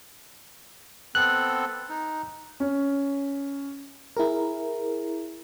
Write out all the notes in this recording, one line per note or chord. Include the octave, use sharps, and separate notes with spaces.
B3 C4 A4 F#6
D#4
C#4
E4 G#4 A#4